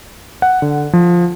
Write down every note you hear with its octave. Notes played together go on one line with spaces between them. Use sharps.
F#5
D3
F3